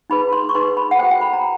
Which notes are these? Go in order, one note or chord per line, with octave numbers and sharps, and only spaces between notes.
D#4 G#4 B4 B5
C6
C#6
D#4 G#4 B4 C6
B5
F#5
F#4 A4 C5 G5
G5
B5
A#5